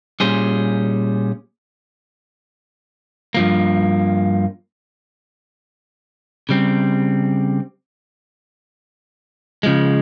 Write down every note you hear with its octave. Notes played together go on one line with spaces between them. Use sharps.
A#2 G3 C#4 G#4 C5
G2 F3 A#3
C#3 G3 C4
C#3 F3 G#3